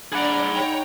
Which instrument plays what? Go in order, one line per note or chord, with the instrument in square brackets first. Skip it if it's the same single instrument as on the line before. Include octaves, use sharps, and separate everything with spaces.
[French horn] D4 [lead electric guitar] G#4 F#5 [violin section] D5 A#5 [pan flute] B5
[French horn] D#4 [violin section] C#5 G5 A#5